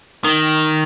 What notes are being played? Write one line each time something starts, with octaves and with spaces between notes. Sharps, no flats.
D#3